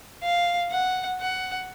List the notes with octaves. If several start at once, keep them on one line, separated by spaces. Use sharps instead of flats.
F5
F#5
F#5